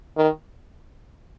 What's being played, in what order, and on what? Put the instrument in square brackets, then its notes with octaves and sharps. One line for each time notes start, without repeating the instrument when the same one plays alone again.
[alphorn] D#3